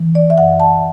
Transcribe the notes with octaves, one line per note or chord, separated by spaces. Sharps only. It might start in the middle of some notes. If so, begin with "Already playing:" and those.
Already playing: E3
D5
E5
F#2 F#5
A5